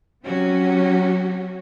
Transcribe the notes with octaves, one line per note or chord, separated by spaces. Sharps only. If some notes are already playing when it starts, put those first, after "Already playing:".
C3 F#3 C#4 F#4 G4